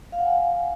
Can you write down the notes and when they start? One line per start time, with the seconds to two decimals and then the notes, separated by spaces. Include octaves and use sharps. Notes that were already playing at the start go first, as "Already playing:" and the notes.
0.12 F5
0.19 F#5
0.25 G#5